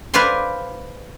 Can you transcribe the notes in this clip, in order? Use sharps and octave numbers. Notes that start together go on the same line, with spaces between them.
B4 C5 D5 F5 G#5 C6